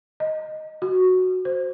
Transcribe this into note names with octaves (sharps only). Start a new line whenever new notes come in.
D#5
F#4
C5